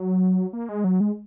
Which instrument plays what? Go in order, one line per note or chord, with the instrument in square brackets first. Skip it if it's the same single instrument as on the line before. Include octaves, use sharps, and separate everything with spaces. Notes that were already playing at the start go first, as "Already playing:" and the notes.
Already playing: [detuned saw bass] F#3
A#3
G#3
F#3
G#3